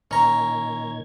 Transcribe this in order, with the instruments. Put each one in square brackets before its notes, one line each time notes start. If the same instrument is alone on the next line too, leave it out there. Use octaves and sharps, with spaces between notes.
[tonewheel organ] A#2 D#3 G#6 [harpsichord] C#4 A#5